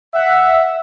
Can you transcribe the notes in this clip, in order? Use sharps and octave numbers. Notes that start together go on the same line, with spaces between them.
E5 F#5